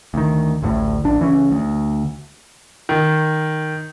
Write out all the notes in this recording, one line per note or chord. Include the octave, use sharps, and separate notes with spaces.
D2 D#3
A1 D2 A2
A#1 D4
C#2 E3 C#4
D2
D#3